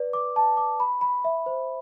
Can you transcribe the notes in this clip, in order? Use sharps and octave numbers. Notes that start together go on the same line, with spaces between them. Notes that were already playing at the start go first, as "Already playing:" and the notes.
Already playing: B4 D5
D6
A5
D6
B5
B5
E5
C5